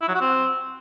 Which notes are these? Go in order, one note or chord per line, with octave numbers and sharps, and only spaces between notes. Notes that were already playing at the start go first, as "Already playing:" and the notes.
E4
F#3
F#4
C4